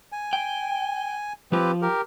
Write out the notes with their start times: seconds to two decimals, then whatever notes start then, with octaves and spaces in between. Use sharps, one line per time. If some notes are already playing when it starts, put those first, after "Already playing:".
0.12 G#5
0.33 G5
1.52 F3 C4 F4 G4 B4
1.82 G4 A#4